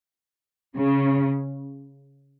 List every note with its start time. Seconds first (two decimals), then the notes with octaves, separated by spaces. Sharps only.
0.76 C#3